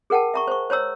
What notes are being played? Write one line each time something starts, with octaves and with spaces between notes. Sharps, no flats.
G#4 A#4 F#5 G5 A5
E5 A#5 C#6
C5 C#6
C5 C#5 A#5 E6